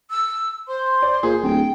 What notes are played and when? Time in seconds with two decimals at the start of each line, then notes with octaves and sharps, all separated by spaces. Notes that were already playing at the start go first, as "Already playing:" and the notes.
0.10 E6
0.68 C5 C6
1.02 D5
1.23 A#2 G#4 C5
1.42 D1 G5